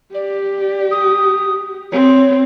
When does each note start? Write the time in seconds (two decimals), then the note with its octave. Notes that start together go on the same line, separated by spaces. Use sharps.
0.14 G4 D5
0.91 D#6
1.92 C4 C#5